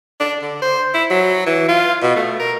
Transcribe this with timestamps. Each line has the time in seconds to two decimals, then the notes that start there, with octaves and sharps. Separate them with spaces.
0.20 D4
0.42 D3
0.62 C5
0.94 E4
1.10 F#3
1.47 E3
1.69 F4
2.02 B2
2.16 A3
2.39 A#4